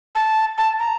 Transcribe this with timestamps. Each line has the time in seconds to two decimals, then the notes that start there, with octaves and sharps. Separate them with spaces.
0.15 A5
0.58 A5
0.79 A#5